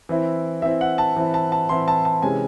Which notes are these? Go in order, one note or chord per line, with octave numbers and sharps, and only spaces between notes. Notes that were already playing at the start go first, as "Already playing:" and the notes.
E3 C4 E4
E3 C4 E4 E5
F#5
A5
E3 C4 E4
A5
A5
E3 C4 E4 C6
A5
A5
C3 E3 G#3 C#4 G#5